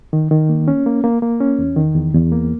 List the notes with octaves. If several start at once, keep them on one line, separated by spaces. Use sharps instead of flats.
D#3
D#3
A#3
C#4
A#3
A#3
A#3
C#4
E2
D#3
E2
E2
A#3